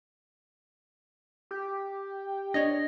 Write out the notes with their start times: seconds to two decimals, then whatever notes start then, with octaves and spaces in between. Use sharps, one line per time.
1.51 G4
2.54 D4 C#5 D#5 A#6